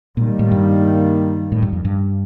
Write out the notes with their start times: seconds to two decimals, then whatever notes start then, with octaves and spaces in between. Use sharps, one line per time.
0.17 A#2 D#3 G3 A#3
0.39 A2
0.51 G2
1.52 A2
1.62 G2
1.73 F2
1.85 G2